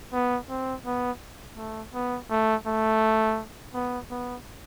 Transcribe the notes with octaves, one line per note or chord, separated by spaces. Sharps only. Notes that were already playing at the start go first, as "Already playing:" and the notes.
B3
C4
B3
A3
B3
A3
A3
B3
B3